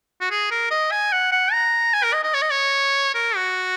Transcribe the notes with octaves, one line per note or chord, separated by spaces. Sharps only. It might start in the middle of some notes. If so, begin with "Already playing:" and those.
F#4
G#4
A#4
D#5
G#5
F#5
F#5
A#5
G#5
A#4
D#5
D#5
C#5
D#5
C#5
A#4
F#4